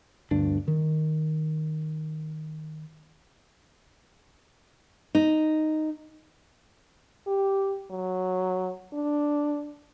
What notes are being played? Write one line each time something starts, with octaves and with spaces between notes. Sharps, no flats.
G1 D2 G2 D4
D#3
D#4
G4
F#3
D4